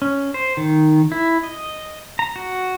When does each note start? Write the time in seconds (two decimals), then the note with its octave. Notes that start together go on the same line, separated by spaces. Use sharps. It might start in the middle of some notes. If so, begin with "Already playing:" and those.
0.02 C#4
0.34 C5
0.57 D#3
1.12 E4
1.43 D#5
2.19 A#5
2.36 F#4